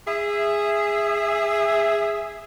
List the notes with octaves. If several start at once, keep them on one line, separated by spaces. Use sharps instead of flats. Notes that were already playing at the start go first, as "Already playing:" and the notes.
G#4 E5